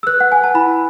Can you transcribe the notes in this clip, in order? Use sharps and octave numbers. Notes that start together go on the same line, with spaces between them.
E6
B4 F#6
F#5
G#5
A5
E4 B5